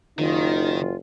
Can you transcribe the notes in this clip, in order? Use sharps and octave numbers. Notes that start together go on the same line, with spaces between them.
F#1 D#3 D#4 F4